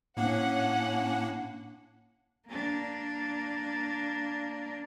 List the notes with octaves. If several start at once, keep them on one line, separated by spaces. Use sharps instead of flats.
A2 A#3 C#4 D4 F#5
A#3 D4